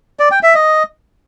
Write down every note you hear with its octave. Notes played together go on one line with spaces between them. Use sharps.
D5
G5
E5
D#5